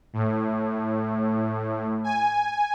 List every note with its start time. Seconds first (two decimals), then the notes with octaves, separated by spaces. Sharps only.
0.13 A2
2.04 G#5